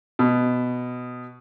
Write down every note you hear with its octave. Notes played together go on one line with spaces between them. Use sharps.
B2